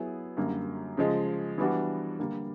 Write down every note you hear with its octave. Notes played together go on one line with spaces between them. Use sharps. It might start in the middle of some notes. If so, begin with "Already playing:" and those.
Already playing: F#3 B3 E4 G#4
F#2 D3 G3 A#3
C#3 F3 G#3
E3 G3 B3 D4 F#4
D3 G3 A#3